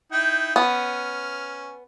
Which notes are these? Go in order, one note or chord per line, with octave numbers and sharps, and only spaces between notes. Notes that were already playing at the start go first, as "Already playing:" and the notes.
D#4 E4 G5
B3 C#4 F6